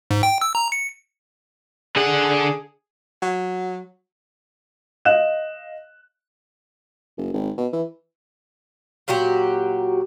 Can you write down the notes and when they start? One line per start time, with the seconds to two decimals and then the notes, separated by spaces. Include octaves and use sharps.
0.11 G#2
0.23 G5
0.41 E6
0.55 A#5
0.72 C#7
1.96 D3 G#4 F#5
3.22 F#3
5.05 D#5 F5 F#6 E7
7.18 F#1
7.34 G#1
7.58 B2
7.73 E3
9.08 A#2 F#3 F#4 G4